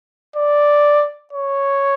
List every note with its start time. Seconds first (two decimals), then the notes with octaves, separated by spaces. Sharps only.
0.36 D5
1.33 C#5